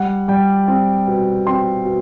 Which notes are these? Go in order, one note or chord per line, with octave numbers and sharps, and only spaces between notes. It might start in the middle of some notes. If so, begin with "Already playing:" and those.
Already playing: G3 F#5
G3 G5
C4
B2
C4 C6
B2